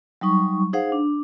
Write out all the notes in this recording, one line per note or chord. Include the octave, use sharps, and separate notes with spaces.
F#3 G3 D#4 C#6
D#4 G#4 C5 F5 F#5
D4